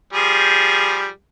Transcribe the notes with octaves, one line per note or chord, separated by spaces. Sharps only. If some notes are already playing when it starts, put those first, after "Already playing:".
F3 G3 G#4